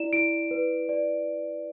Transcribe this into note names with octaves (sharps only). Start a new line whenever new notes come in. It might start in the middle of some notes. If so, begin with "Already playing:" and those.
Already playing: E4 D5 E7
E4 D7
B4
D5